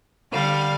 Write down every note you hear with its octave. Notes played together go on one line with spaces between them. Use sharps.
D3 G3 F5